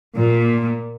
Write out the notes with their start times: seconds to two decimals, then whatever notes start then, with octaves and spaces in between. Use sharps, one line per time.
0.14 A#2